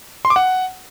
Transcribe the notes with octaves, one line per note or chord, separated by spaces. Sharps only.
C6
D6
F#5